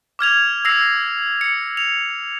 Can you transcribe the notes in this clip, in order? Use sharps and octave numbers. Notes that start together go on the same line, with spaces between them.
D6 F6 G#6 F7
E6 A#6 C7 F7
C#7
F7